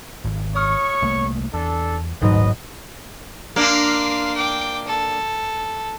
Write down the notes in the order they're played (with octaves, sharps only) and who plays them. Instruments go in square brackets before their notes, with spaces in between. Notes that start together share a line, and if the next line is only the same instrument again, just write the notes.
[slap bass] G#1
[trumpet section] C#5 C#6 [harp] D#6 F6
[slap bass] C2 A3 A#3
[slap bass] E2 [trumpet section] D4 A4
[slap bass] D#1 A1 D2 [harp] G#2 F#3 [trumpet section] B4 D#5
[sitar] A#3 D4 [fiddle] F5 C6
[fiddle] G5 D6
A4